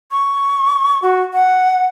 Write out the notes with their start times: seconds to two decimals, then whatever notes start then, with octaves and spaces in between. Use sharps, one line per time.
0.12 C#6
1.03 F#4
1.33 F#5